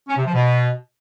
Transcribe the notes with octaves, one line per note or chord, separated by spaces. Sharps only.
C#4
C3
F3
B2